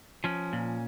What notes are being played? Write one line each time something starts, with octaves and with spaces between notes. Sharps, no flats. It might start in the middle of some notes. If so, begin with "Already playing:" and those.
F3 C#4
A#2